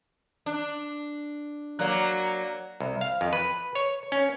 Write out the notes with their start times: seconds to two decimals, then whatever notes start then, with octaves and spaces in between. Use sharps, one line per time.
0.46 D4
1.79 F#3 A#3 D5 A#5 F#6
2.80 C2
3.01 F5
3.21 F2
3.33 B4
3.75 C#5
4.12 C#4